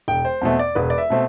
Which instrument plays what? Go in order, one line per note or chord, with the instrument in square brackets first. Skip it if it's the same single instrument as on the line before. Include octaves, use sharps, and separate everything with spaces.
[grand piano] E1 G5
C5
E2 B2 A3 C4
D5
E1 B4
D5
E5
B2 A3 C4